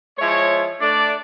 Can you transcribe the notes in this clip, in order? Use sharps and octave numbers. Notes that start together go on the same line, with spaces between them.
F3 G#3 E4 C#5
A3 D4 D5